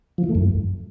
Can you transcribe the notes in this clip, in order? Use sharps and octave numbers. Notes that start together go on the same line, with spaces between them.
F3
E3
A3
F#2